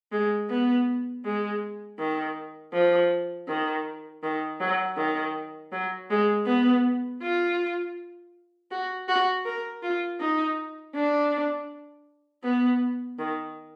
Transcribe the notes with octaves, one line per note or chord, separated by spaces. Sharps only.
G#3
B3
G#3
D#3
F3
D#3
D#3
F#3
D#3
F#3
G#3
B3
F4
F#4
F#4
A#4
F4
D#4
D4
B3
D#3